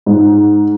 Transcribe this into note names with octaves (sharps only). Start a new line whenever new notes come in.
G#2